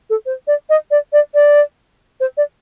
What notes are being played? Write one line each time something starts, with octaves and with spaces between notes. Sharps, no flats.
A4
C5
D5
D#5
D5
D5
D5
C5
D5